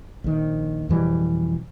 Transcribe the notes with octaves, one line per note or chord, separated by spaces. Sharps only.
A#1 D#3
F2 B2 E3 G3